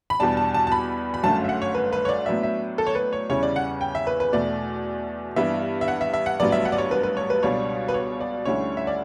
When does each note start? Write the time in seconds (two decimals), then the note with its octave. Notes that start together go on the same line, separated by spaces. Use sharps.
0.10 B5
0.19 E2 B2 G3 D4 A5
0.37 A5
0.54 A5
0.67 A5
0.72 B5
1.14 B5
1.23 G1 F#2 D3 A3 C#4 A5
1.44 E5
1.49 F#5
1.62 C#5
1.75 B4
1.93 B4
2.05 C#5
2.09 D5
2.26 A2 F#3 B3 D4 E5
2.43 E5
2.78 A4
2.87 C#5
2.95 B4
3.13 C#5
3.30 E2 C#3 G3 C#4 E4 C#5
3.43 D5
3.56 F#5
3.81 G5
3.95 E5
4.07 B4
4.20 B4
4.33 E2 B2 A3 D5
5.36 G2 E3 G3 B3 E5
5.81 E5
5.88 F#5
6.01 E5
6.14 E5
6.26 F#5
6.40 A1 G2 F#3 B3 D5
6.52 E5
6.65 F#5
6.72 D5
6.78 C#5
6.91 B4
7.03 B4
7.17 C#5
7.30 B4
7.43 C#2 B2 G3 D4 C#5
7.88 B4
7.94 C#5
8.20 D5
8.45 D2 D3 G3 C#4 E4 C#5
8.77 E5
8.87 D5